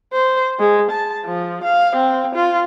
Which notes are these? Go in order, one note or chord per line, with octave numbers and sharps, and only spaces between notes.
C5
G#3
A5
F3
F5
C4
F4